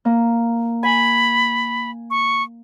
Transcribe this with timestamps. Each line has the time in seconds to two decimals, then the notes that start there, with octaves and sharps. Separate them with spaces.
0.05 A#3
0.83 G#5 B5
2.10 C#6